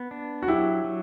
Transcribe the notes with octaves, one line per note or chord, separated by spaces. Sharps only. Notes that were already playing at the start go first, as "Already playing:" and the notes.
Already playing: B3
D4
F#4
F#3 E4 G4
F#3